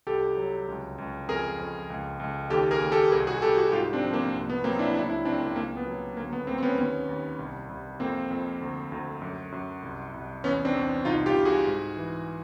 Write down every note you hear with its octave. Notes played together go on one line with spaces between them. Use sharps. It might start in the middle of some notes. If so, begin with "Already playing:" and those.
C2 G4 A4
F#3
C#2
C#2
F2 G#4 A#4
F2
C#2
C#2
D#2 G4 A4
G#4 A#4
D#2
G4 A4
C2 G#4 A#4
F#4 G#4
C2 G4 A4
F#4 G#4
G#2 F4 G4
C4 D4
F3
A#3 C4
C2
B3
F#3 A#3 C4
D4 E4
C#2 D4 E4
D4 E4
C#2 C4 D4
A#3 C4
C#2 A#3
B3
F#3
D2 A#3
B3
D2 A#3 C4
C4
B3 C#4
D#2 B3 C#4
D#2
C2
C2
F2 A#3 C4
F2
D2
D2
F#2
F#2
C2
C2
E2 B3 C#4
C4 D4
E2
C2 D#4 F4
F4 G4
C2
F#4 G#4
G#2
E3